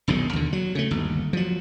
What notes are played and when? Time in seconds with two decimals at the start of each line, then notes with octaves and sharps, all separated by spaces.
0.08 E1 B1 A2 D#3
0.33 D#2 D3
0.53 F#3
0.75 C#3 A3
0.91 G1 D#2
1.33 F3 F#3